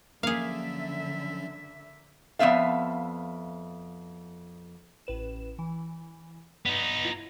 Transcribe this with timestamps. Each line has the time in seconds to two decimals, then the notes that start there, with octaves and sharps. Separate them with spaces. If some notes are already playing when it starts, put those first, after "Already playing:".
0.23 D3 F3 F#3 A#3 C#4 G#4 E5 F5
2.39 F2 F3 B3 E5 F5
5.07 A1 B4 E7
5.59 E3
6.66 G2 B3 D#4
7.05 E4 F4